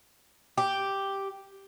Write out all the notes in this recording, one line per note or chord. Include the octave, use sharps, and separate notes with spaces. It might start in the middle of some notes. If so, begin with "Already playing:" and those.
G4